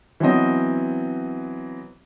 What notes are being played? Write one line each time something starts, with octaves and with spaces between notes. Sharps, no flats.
E3 F#3 B3 C4 D#5